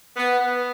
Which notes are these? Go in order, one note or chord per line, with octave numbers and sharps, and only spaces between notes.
B3
B3